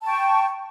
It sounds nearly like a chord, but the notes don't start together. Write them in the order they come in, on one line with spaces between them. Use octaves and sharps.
A5 G5 C#6